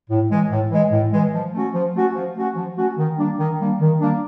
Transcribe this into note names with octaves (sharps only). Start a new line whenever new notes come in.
A2
E3 G#3
A2
E3 G#3
A2
E3 G#3
F3
A3 C#4 F#4
F3
A3 C#4 F#4
F3
A3 C#4 F#4
F3
A3 C#4 F#4
D#3
G3 A#3 D4
D#3
G3 A#3 D4
D#3
G3 A#3 D4